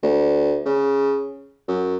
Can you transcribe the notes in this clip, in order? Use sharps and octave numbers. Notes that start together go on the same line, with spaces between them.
D2
C#3
F#2